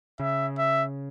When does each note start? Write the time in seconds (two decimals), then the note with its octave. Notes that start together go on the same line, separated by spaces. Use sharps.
0.20 C#3 E5
0.58 E5